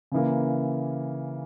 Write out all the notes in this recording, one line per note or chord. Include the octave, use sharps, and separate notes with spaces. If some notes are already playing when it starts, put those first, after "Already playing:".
C#3 E3 A#3